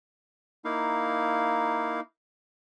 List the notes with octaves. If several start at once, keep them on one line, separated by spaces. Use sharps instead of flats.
A#3 D#4 E4 F5